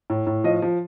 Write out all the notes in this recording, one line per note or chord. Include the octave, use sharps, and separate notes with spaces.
A2
A2
F3 D#5
F3